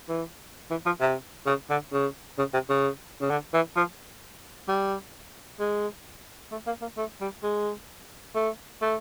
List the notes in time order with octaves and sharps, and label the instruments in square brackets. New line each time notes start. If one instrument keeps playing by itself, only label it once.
[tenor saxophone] E3
E3
F3
C3
C#3
D3
C#3
C#3
C3
C#3
C#3
D3
E3
F3
G3
G#3
A3
A#3
A#3
A3
G3
G#3
A3
A3